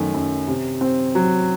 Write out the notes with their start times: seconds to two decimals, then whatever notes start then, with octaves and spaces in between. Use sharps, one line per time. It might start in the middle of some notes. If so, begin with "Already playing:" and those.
Already playing: F#2 D#3 A3
0.14 F#2
0.48 C3
0.81 C4
1.15 F#3